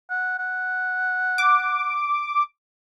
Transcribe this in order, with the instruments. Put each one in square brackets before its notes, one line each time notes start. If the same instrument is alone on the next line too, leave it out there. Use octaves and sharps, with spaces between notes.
[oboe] F#5
F#5
[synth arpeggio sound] D6